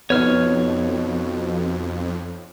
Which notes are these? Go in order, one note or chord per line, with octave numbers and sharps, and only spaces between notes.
F2 B2 B3 D#4 C#5 F6